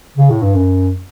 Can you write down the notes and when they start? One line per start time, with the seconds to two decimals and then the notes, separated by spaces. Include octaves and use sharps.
0.17 C#3
0.30 A2
0.42 G2
0.54 F#2